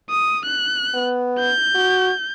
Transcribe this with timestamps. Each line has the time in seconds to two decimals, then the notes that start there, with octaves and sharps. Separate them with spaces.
0.11 D#6
0.46 F#6
0.94 B3
1.39 G6
1.75 F#4